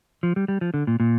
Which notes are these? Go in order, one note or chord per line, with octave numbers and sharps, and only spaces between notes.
F3
G3
G3
F3
D3
A#2
A#2